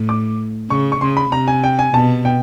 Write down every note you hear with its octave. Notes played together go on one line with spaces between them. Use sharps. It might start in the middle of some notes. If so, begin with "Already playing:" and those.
Already playing: A2
D6
C#3 C#6
C#6
C#3 C6
B5
C3 A#5
G#5
G5
G#5
B2 A5
G5